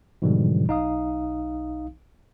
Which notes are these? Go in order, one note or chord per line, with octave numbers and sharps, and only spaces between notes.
G#2 B2 D3 E3 F3 G3
B1 D#4 F5 D#6